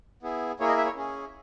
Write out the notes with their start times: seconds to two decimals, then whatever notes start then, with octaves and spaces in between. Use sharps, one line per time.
0.23 B3 E4 G#4
0.60 A#3 E4 G#4 C#5
0.69 D#5
0.77 E5
0.86 C#5
0.96 C#4 G#4